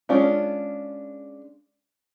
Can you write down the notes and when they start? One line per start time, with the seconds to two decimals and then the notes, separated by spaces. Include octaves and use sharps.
0.09 G#3 C#4 D4 F4